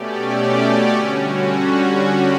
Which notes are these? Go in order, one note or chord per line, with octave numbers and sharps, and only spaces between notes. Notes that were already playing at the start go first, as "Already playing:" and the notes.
Already playing: B2 A3 C#4 G4 D5
D3 G3 C#4 F#4